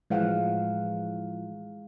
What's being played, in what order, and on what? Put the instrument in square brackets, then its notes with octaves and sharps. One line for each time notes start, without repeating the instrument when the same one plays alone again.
[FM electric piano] A2 E3 F3 [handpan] G#3 F5 F#5